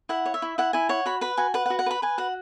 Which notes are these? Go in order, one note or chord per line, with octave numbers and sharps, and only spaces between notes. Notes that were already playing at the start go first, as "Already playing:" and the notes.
E4 F#5
C#5
E5
E4
E4 F#5
E4 G#5
C#5 F#5
F#4 B5
B4 B5
F#4 G#5
B4 F#5
F#5
F#4
F#5
B4 B5
B4 G#5
F#4 F#5